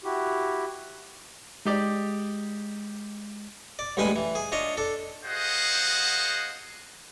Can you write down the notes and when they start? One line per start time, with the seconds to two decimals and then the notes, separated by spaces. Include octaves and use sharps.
0.04 E4 F#4 G4
1.66 G#3 D#4 G4 D5
3.79 D5
3.97 A1 G2 G#3 B4 G#5 B5
4.16 E3
4.35 G#4
4.52 D4 F4 C#5 D#5
4.77 D4 A4
5.26 F#4 G#4 C5 D#5 F5 F#5